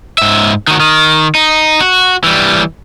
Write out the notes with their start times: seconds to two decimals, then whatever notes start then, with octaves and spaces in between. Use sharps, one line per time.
0.18 G#2 E5
0.67 D#3 F#4
0.80 D#3
1.35 D#4
1.81 F#4
2.24 E3 G3